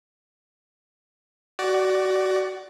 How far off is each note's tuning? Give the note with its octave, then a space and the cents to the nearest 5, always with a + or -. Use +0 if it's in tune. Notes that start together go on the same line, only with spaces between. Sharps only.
F#4 +25 D5 +0